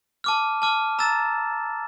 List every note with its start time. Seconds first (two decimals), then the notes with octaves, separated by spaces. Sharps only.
0.24 A5 D6 F6
0.62 A5 D6 F6
0.99 A#5 E6 A6 E7